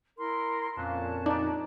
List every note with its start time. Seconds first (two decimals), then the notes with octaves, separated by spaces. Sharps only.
0.18 E4 A#4 C6
0.77 F2 A#2 C#4 A5 F#6
1.26 D4 D#4 D5